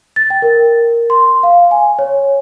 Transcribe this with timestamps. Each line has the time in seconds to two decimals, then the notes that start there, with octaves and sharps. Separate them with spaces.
0.16 A6
0.30 G5
0.42 A#4
1.10 C6
1.43 F5
1.71 G#5
1.99 C#5